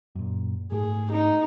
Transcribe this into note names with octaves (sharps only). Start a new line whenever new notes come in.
F#2 A#2
G#2 A3 G#4
D#4